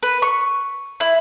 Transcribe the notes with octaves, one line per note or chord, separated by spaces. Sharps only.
B4
C#6
E4